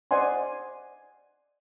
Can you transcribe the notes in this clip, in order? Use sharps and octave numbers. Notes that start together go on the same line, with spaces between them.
C5 D5 D#5 F#5 G#5 C6